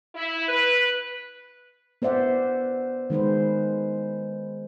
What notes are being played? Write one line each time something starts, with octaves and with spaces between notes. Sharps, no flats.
E4
B4
B3 C5 D5 E5 F#5
D#3 G#3 B4 C5